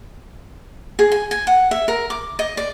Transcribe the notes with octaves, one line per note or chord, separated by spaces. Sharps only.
G#4
G#5
G#5
F#5
E5
A#4
D6
D#5
D5